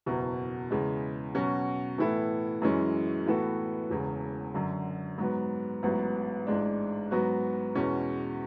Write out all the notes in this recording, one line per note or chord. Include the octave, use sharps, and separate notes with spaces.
F#1 E2 B2
E2 C#3 G#3
B2 F#3 C#4 F#4
A2 E3 B3 E4 A4
F#2 E3 G#3 C#4
A2 E3 B3 F#4 A4
E1 E2 C#3
F#2 D3 F#3
G#2 F#3 B3
A1 G#2 F#3 B3
A1 G#2 G#3 D4
G#2 F#3 B3 F#4
E2 B2 G#3 C#4